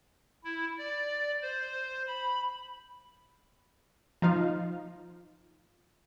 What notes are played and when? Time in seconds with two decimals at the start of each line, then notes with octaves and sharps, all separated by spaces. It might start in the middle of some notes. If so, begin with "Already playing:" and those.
0.44 E4
0.78 D5
1.42 C5
2.07 B5
4.22 F3 D#4 F4 F5